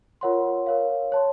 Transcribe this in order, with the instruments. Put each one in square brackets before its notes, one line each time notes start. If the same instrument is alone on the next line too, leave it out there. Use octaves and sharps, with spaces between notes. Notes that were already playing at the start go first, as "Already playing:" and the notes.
[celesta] F4 A#4 C#5 F#5 C6
A#4 C#5 F5
C#5 A5 C6